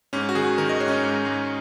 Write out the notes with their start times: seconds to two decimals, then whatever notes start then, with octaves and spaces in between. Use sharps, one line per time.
0.13 G#2 C#4
0.29 F#4
0.35 D#3 G#4
0.58 D#3 A#4
0.69 D#5
0.80 G#2 C#5
0.88 C#4
0.91 D#4
1.03 G#2
1.25 G#2